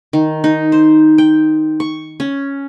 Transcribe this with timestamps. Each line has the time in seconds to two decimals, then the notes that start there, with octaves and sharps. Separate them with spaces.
0.13 D#3
0.44 D#4
0.72 C5
1.18 G5
1.80 C#6
2.20 C#4